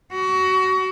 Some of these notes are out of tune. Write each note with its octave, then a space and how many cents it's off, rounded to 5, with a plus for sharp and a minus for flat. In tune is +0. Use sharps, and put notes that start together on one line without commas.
F#4 +25